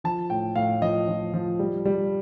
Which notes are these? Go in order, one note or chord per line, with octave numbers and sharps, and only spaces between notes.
F3 A5
A2 G5
A2 F5
F3 D#5
F3
F3
G3
G3